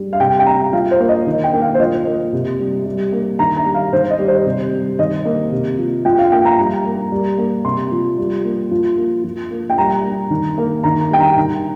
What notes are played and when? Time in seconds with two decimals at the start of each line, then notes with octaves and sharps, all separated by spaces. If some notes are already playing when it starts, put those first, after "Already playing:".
Already playing: G3
0.13 F5
0.20 C3 G5
0.39 G5
0.46 G3 A#5
0.73 F3 F5
0.91 C5
1.00 A#3
1.08 D#5
1.27 D#3
1.44 G5
1.53 A#3
1.62 F5
1.74 C5
1.79 F3 D#5
2.06 A#3
2.33 C3
2.60 G3
2.86 G3
3.12 A#3
3.39 D#3 A#5
3.57 A#5
3.66 G3
3.74 F5
3.93 D#3 C5
4.10 D#5
4.19 G3
4.28 C5
4.46 C3
4.72 G3
4.99 D#3 D#5
5.25 A#3
5.52 C3
5.78 F3
6.05 F3 G5
6.18 F5
6.32 A#3 G5
6.45 A#5
6.58 G3 A#5
6.85 A#3
7.12 G3
7.38 A#3
7.65 C3 C6
7.92 F3
8.18 G3
8.44 A#3
8.71 F3
8.98 A#3
9.24 F3
9.51 A#3
9.70 G5
9.78 G3 A#5
10.04 A#3
10.30 D#3
10.58 A#3
10.83 D#3 A#5
11.10 G3 G5
11.20 A#5
11.37 D#3